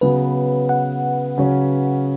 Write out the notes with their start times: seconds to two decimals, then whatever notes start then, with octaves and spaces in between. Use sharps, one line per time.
0.01 C#3 F#3 B3 B4
0.69 F#5
1.38 C#3 F#3 C#4